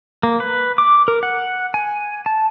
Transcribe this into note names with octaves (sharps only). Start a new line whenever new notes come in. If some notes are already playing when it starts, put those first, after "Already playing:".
A#3
B4
D6
A#4
F#5
G#5
A5